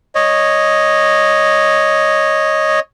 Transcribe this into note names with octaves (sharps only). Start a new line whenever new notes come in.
C#5 D#5